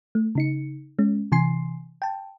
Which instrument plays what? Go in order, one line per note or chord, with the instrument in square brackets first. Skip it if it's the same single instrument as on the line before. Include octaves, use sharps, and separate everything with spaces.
[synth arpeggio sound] A3
C#3 D#4 C#7
G#3 C#4
C3 E3 G#5 C6 C7
G5 A5